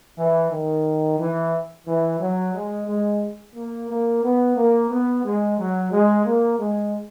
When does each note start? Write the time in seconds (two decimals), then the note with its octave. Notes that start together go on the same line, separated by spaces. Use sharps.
0.18 E3
0.51 D#3
1.19 E3
1.87 E3
2.20 F#3
2.54 G#3
2.87 G#3
3.55 A#3
3.89 A#3
4.23 B3
4.56 A#3
4.90 B3
5.24 G#3
5.58 F#3
5.92 G#3
6.26 A#3
6.59 G#3